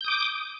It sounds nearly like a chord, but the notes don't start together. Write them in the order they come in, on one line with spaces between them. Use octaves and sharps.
G6 D#6 D6